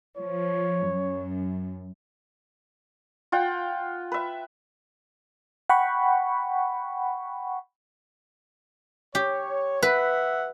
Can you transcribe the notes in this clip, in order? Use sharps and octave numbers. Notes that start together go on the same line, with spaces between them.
F3 C#5
F#2
F4 F#5 G5
B4 E5
F#5 G5 B5 C#6
G4 C#5
B4 E5 F#5